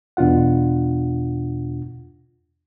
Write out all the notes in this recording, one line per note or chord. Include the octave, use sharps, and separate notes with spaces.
E2 B2 D4 F4 F#5